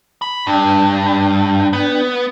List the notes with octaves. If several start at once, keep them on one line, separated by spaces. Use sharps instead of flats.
B5
G2 D4 G5
B3